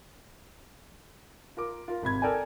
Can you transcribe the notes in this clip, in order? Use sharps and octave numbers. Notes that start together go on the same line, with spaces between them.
F4 A#4 D6
F4 A#4
G#1 C3 B5 G#6
A4 A#4 D5 G5 G#5